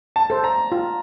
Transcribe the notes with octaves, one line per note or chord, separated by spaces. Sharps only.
A5
A4 C5
A#5
F4